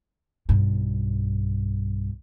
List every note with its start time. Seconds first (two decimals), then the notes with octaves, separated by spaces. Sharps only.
0.49 B1 G2